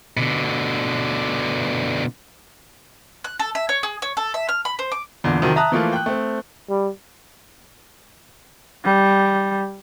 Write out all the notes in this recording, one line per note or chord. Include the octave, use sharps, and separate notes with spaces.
B2 D3
F#6
A4
E5
C#5
G#4
C#5
A4
E5
F6
B5
C5
D6
E2 A#2 D3
C3 D#3 F3 F#3 C4
E5 A5 A#5 D#6 F#6
E3 F3 A3 A#3 F4
G5 F#6
A3 C4
G3
G3